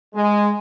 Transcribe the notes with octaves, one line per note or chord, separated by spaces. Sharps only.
G#3